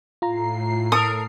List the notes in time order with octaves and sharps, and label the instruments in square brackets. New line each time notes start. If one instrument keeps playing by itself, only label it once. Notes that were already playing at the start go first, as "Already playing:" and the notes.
[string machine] A2 C7 [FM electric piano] F4 A#5
[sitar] A4 A#4 [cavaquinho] D#6